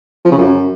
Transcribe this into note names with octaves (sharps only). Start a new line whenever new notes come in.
F3
C#3
F#2